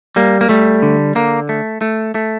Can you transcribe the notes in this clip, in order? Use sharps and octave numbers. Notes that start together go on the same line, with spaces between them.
G3 A#3
A#3
G3 A3
D3
D3 A#3
A3
A3
A3